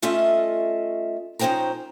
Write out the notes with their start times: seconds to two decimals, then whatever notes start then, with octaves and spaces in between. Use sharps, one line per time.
0.02 A3 C#4 F4 A4 D#5 E5
1.39 F3 C#4 D#4 C5 G5 A#5